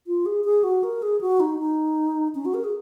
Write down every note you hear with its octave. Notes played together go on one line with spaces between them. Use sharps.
F4
G#4
G#4
F#4
A#4
G#4
F#4
D#4
D#4
C#4
F#4
A#4
G#4